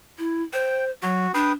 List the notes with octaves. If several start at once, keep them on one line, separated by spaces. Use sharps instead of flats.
E4
C5 G5
F#3 F#4
D4 B4 G5 D#6